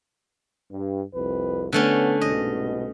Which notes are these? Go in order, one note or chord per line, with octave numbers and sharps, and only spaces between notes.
G2
C2 F2 B4
D3 A3 B3 C#4
C2 G#2 B2 D#5